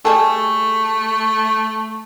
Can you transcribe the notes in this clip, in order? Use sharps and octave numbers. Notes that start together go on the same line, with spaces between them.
G3 A3 G#4 A4